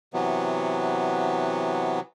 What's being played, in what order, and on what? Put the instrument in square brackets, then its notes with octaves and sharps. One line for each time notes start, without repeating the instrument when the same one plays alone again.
[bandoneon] C3 E3 F#3 B3